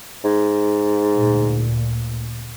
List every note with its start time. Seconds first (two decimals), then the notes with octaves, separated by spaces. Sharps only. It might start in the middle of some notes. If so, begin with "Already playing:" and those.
0.24 G#2
1.15 D2 A#2